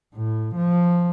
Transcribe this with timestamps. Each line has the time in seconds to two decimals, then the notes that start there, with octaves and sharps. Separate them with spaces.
0.15 A2
0.56 F3